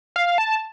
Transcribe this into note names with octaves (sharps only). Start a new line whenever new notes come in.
F5
A5